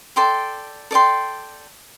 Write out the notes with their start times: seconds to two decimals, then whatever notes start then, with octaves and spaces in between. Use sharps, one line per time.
0.16 A4 D5 G5 C6
0.91 A4 D5 G5 C6